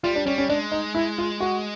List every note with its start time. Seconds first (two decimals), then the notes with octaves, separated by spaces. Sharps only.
0.03 G3 F4
0.15 D4
0.26 G3 C#4
0.38 C#4
0.49 G#3 D4
0.72 D#4
0.94 E4
1.18 F4
1.40 F#4